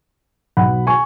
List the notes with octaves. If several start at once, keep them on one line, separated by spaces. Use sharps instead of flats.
B1 B2 F#3 F#5 B5
G#5 C#6